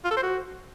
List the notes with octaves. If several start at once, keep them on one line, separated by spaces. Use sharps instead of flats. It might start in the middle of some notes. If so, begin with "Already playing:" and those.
F4
A4
C5
F#4